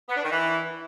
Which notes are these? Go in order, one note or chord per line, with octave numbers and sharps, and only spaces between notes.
B3
D4
D#3
E3